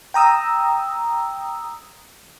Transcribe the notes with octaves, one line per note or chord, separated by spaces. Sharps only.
G5 A#5 D#6 E6